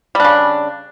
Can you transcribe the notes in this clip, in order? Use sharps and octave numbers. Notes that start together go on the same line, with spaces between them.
C#3 G3 D4